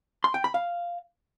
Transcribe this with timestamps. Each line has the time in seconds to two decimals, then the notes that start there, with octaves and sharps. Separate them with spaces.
0.24 C6
0.34 G5
0.44 B5
0.54 F5